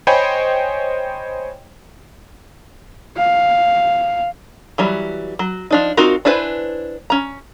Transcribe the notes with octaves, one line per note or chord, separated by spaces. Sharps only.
C5 C#5 D#5 G5 G#5 B5
F5
E3 F#3 G3
F#3
F3 D4 D#4
C4 D#4 F4 F#4 A#4
D4 E4 B4 C5 G#5
C#4 A#5